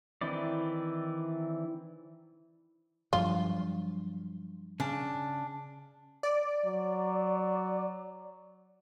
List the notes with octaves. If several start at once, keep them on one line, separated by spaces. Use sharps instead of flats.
D#3 E3 C4 E4 D5
G2 F3 F#3 F4
C#3 D4
D5
F#3